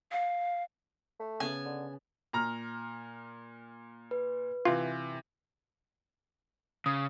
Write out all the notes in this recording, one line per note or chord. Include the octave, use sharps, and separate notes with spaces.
F5
A3
C#3 B3 G#5 A5
D3
A#2 A#5 F6
B4
C3 E3 F4
C#3 D#6